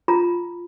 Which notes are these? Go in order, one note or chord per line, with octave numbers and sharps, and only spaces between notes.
F4 A#5